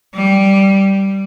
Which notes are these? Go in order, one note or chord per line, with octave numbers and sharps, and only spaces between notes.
G3